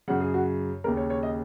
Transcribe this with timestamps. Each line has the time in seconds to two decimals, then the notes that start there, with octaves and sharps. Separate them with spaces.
0.08 F#2 C#3 F#5
0.21 G#4
0.34 F#4
0.84 D#2 C#3 A#4
0.97 C#5
1.10 C#5
1.23 D#5